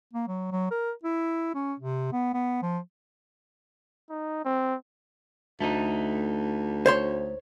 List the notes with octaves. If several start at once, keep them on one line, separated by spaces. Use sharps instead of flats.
A#3
F#3
F#3
A#4
E4
C#4
C3
B3
B3
F3
D#4
C4
D2 A3 D#4
C5 C#5 C6